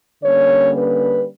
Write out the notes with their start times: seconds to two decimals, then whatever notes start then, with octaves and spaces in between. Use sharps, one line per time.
0.23 D3 G3 A#3 C#4 C#5
0.76 B4